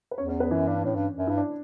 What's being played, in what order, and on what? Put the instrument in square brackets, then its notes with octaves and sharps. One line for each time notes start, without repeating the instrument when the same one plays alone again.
[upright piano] B4
[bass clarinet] E2 [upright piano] C#4 C#5
[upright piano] C#4 C#5
B3 B4
[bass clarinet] F#2 [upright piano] E3 E4
[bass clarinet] G2 [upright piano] D4
[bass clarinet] A2 [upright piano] C#4
[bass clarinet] G2
[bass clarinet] F#2 [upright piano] D4
[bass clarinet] G2 [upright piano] E4
[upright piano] D4